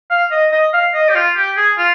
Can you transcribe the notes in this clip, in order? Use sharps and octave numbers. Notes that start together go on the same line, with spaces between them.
F5
D#5
D#5
F5
D#5
G4
F4
G4
G#4
F4